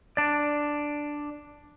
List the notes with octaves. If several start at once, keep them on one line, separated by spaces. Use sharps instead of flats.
D4 D5